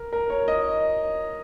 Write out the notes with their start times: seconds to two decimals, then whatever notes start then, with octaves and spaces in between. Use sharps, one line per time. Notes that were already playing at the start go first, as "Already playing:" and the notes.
Already playing: A#4
0.13 A#4
0.30 C#5
0.48 D#5